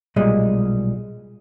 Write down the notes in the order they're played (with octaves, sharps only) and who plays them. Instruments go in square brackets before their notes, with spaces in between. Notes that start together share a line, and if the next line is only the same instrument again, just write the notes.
[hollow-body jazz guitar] B1 A#2 G3 G#3 D#5